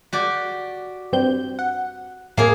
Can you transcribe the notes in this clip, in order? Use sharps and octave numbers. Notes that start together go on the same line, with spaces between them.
F#4 G4 D5
G2 C4 G6
F#5
A2 A#3 G#4